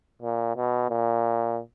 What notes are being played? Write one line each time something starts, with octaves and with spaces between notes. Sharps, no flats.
A#2
B2
A#2